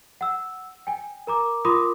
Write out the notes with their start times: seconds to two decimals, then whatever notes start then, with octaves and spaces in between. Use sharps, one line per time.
0.21 F#5 E6
0.87 G5 G#5
1.27 A#4 A#5 D6
1.65 F4 A#4 B5 C6 D6 D#6